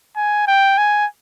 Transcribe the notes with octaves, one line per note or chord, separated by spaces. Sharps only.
G#5
G5
G#5